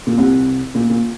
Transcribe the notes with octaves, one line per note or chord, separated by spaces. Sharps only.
A#2
C2 C3
A#2
A#2